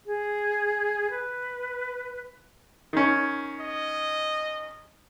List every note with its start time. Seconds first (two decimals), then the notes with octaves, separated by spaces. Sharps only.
0.06 G#4
1.10 B4
2.93 D#3 C#4
3.61 D#5